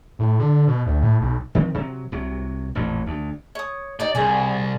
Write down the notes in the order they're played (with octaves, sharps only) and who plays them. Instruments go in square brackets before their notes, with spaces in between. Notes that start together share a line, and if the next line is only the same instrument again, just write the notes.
[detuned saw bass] A2
D3
B2
D2
A2
B1
[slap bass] D#3 F3 C4
C3 F#3
C2 C3 F#3
A1 F2 A#2
D2
[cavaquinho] C#5 D#6
[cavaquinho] D#4 G4 D#5 [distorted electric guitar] D5
[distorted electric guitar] C2 [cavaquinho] G#4 D5 G#5